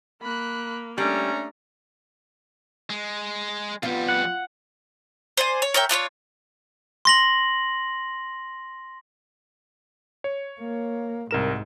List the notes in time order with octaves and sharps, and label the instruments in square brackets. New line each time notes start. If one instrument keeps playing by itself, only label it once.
[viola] A#3 [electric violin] B5 F#6
[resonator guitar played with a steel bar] G3 [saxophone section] A3 C#4 [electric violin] D4 A#5
[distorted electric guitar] G#3
[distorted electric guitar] F2 G3 [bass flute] B3 [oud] F4
[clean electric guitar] F#5
[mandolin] C5 D5 G#5
C#5
A#4 C#5 E5 G5
D4 F4 C5 C#5
[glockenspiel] C6 A#6 F#7
[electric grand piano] C#5
[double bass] A#3
[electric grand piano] C2 A#4 E7 [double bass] G#2